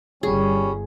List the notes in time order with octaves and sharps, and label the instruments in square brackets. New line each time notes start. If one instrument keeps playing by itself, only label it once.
[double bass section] G1 [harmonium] G3 [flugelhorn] C#4 [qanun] G#4